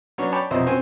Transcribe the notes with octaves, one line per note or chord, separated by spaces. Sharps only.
F#3 B3 C#4 D4 F#4 C#5
C#5 D5 G5 A5 B5 C#6
B1 F2 C3 E4 C5 D#5
C4 C#4 F#4 C5 G5 G#5